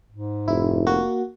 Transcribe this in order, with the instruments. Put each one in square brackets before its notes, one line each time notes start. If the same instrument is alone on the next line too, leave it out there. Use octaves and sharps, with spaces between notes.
[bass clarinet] G#2
[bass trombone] F1 [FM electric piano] E4
[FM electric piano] A#3 F#4